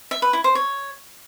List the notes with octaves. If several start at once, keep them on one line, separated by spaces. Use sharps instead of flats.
E5
B4
E4
C5
C#5